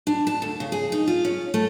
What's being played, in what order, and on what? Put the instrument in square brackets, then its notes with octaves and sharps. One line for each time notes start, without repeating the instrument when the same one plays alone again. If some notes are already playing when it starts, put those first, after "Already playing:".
[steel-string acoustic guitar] D4
A5
D2
C#3
G#4
D#4
F4
C#4
A3